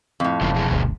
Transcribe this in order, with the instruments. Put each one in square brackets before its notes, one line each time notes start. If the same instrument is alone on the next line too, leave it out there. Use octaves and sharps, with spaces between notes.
[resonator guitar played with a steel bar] F2 A2
[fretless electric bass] E1 [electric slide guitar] G2 C#3 F4
[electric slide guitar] B2 F3 G#4
[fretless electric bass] D1 G1 D2